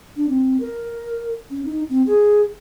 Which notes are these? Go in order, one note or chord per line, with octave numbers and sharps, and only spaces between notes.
D4
C4
A#4
C#4
D#4
C4
G#4